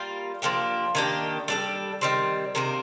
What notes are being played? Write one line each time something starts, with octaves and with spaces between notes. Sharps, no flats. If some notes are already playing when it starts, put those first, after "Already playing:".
Already playing: G3 A#3 F4
F3 A#3 D4 G4
D#3 A#3 D4 G4
G3 D4 A4
D#3 G3 C4
C3 D#3 A#3 D4